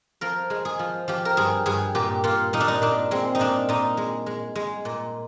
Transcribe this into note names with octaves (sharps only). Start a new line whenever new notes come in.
F3 A#4
G#3
G#4
F3
F3 G4
A#4
G2 G#4
G2 G#4
A#2 G4
A#2 F4
A#2 D#4
D4
D#4
A#2 D4
G#3 C4
D#4
A#2 D4
A#2 D#4
G#3
G#3
G#3
A#2